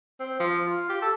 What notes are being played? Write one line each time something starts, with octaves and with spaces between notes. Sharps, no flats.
C4
F3
F4
G4
A4